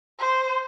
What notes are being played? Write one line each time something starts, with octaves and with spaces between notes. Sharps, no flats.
C5